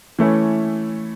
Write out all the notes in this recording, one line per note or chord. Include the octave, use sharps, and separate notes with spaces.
E3 A3 C#4 E4